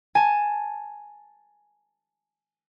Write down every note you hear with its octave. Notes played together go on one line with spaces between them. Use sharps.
G#5 A5